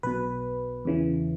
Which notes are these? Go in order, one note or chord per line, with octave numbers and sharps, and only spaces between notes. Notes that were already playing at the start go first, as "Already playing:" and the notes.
B1 B2 B4
E2 C#3 E3